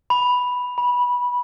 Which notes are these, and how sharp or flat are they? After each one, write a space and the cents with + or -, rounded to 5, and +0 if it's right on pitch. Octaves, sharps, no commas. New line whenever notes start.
B5 +0
B5 -15